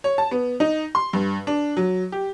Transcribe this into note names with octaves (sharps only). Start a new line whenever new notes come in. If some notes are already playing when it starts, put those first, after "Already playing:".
C#5
A5
B3
D#4
C6
G2
D4
F#3
G4